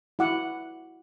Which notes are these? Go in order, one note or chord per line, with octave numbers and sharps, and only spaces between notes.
E4 F#4 F#5 D6